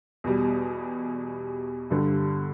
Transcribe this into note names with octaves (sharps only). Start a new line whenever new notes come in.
E2 B2 G3
G2 D3 G3